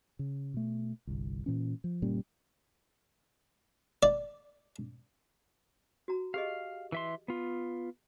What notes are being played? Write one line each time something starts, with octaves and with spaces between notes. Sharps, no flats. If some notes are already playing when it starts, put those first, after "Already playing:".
C#3
B2 A3
G1 C2
A#2 E3 C#4
F3
F#1 A#2 G3 C#4
D5
F#4 A#5
G4 G#4 D#5 F5
E3 E5 C6
B3 F4